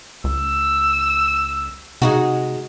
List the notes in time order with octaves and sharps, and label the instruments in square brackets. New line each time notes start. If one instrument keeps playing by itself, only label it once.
[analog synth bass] C#2 [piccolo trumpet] E6
[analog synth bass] C3 [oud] G#3 D#4 F#4